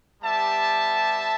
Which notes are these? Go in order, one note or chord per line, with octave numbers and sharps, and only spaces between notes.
G3 B3 G4 E5 A5